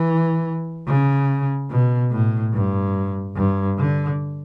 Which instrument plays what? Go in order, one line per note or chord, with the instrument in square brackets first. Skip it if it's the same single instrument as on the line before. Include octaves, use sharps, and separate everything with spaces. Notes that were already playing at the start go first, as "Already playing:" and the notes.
Already playing: [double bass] E3
C#3
B2
A2
G2
G2
D3